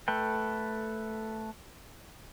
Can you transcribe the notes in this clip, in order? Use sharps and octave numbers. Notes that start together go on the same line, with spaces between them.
A3 A4 B4 G5